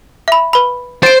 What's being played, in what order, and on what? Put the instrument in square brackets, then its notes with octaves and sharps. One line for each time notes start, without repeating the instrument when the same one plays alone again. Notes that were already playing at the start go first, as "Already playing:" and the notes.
[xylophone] E5 B5
B4 B5
[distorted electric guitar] C5 [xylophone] A6 D7